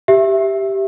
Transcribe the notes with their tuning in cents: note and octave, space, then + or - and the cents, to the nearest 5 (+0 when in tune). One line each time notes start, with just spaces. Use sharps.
G4 +0 E5 +0